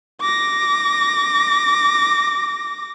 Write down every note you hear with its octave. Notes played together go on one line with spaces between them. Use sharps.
D6 A#6